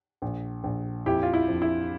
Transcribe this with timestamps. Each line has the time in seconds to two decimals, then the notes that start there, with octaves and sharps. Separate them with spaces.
0.22 A#1
0.64 A#1
1.06 F2 E4 G4
1.23 F4
1.34 E4
1.48 F2
1.62 E4